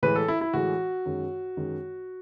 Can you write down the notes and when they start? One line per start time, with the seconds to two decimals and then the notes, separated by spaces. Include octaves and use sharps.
0.03 A2 E3 G#3 B4
0.16 A4
0.28 E4
0.41 E4
0.54 A2 E3 G#3 F#4
1.05 F#2 D#3 G#3
1.57 F#2 D#3 G#3